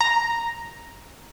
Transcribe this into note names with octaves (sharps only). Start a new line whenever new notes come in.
A#5